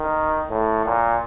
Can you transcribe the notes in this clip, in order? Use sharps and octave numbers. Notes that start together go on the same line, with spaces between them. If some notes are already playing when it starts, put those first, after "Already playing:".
Already playing: D#3
A2
A#2